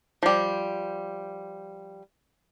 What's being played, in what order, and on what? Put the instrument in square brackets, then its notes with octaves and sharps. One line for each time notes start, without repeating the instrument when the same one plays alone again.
[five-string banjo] F3 G3